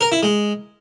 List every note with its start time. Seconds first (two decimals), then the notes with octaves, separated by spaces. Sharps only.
0.01 A#4
0.12 E4
0.23 G#3